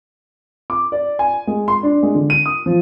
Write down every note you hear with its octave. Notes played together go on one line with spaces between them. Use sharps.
D6
D5
G#5
G#3
C6
D4
G#3
D3
D#7
D#6
F3